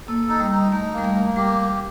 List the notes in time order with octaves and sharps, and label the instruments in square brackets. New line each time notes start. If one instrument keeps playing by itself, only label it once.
[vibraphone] A#3 [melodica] A4
[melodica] D#4
[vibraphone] G3
[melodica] D#4
[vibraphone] A3 [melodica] D#4
[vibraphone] G3 [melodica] A#3
[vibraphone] A3
[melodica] A#3
[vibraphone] G3 [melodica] G4